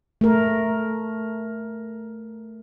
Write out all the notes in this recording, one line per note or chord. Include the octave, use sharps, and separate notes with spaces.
A3 A#4